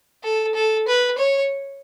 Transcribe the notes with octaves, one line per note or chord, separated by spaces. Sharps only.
A4
A4
B4
C#5